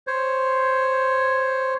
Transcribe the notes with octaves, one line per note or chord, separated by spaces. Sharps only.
C5 C#5